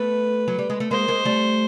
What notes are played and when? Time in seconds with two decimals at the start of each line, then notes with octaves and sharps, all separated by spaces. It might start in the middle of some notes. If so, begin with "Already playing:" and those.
Already playing: A3 B3 B4
0.48 F#3
0.59 G3
0.70 G#3
0.80 A3
0.91 G#3 A#3 C5
1.08 G#3 A#3
1.25 G3 A3